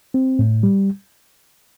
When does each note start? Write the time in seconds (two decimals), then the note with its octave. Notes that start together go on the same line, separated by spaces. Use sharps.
0.14 C4
0.39 A2
0.63 G3